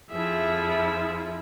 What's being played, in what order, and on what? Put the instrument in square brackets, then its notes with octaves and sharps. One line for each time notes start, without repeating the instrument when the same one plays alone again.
[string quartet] F2 F3 E4 [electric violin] G#4 E5